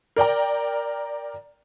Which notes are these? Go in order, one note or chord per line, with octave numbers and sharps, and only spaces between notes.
A#4 D5 G5 A#5